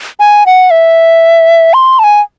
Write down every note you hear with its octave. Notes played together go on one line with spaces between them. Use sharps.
G#5
F#5
E5
C6
A5
G#5